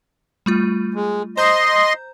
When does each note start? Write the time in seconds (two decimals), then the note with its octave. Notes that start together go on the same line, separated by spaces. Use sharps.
0.46 G3 A3 F4
0.94 G#3
1.37 C5 D#5 A#5 C6 G6